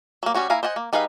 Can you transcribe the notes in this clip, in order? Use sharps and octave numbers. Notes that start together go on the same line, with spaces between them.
F#3 A#3
G3 C#4 F#4 C#5
A#3 E4 F5 G#5 A#5
C5 D#5 F#5 G#5
A#3
G3 D#4 G#4 B4 F5